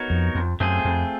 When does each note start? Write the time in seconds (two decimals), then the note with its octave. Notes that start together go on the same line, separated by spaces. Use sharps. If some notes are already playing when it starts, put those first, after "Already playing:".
Already playing: B3 D#4 F#4 A#4 C#5
0.10 F2
0.35 F2
0.60 F#2 A3 C4 F4 G#4
0.85 F2